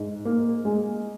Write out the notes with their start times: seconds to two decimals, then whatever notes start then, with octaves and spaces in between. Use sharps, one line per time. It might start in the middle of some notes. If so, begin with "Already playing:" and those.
Already playing: G#2
0.25 A#3
0.65 G#3